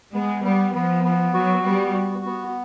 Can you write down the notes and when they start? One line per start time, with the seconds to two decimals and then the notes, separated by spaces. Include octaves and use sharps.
0.13 G#3 B3
0.44 G3 B3
0.74 F3 B3
1.04 B3
1.34 F#3 F#4
1.65 G3 B3
1.94 F#4
2.25 B3